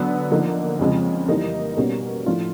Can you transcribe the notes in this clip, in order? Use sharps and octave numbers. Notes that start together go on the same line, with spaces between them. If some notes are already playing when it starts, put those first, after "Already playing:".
Already playing: D3 F#3 B3
D3 F3 A#3 D#4
F2 C#3 F3 G#3
E3 G3 A#3 D#4
B2 G3 A#3 C#4
A2 F3 A3 D4 F4